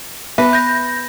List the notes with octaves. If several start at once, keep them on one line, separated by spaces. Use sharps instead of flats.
B3 B4 E5
G6 A#6